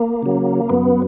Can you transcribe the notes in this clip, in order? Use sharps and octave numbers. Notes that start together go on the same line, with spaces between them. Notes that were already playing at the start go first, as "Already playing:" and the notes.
Already playing: A#3
C#3 F#3
F#2 B3